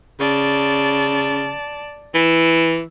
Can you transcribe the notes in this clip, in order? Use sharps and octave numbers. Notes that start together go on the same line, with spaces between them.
C#3 D5 A5
E3 E6